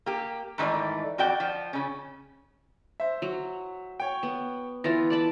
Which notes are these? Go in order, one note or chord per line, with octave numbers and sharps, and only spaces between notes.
A#3 G4
G#2 D#3 E3 A3 D5
F2 F#4 D5 G5
F3
C#3 C#4
C5 E5
F#3
C#5 G5
B3
E3 B3 F4 A6 A#6
D5 A5 B5